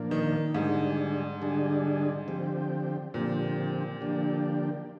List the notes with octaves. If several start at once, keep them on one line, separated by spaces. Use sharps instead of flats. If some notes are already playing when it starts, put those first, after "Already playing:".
Already playing: A#2 F3 A#3 D4
D#3
G#2 D3 G3 D4 G#4
D3 G3 D4 G#4
D3 F3 C4 G4
A#2 D3 F3 C4 G4
D3 F3 A#3 D4 G4